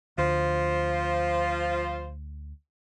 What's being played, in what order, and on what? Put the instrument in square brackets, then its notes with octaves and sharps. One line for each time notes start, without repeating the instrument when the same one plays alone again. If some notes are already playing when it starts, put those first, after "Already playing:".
[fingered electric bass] D2 [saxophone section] F3 F4 C5